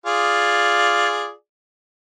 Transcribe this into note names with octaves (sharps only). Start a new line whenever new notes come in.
F4 G#4 D5